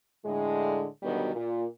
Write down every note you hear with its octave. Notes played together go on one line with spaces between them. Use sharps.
A2 D3 G#3
B2 D3 D#3 F#3 G3 B3
A#2